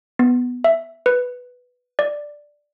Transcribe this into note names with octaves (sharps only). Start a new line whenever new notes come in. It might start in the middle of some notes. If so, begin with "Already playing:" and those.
B3
E5
B4
D5